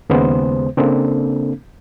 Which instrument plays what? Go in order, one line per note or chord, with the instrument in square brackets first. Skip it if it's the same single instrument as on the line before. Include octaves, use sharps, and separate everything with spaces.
[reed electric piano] D#2 C#3 G#3 B3 C5
C#3 A#3 C4 D4 A4